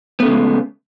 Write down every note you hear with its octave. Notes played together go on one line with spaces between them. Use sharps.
C#3 G#3 A3 B3 C#4